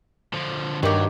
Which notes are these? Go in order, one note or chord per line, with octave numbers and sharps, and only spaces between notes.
D3 F3
G2 D#3 F#3 G4